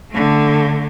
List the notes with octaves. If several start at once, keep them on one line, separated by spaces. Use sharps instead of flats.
D3 A3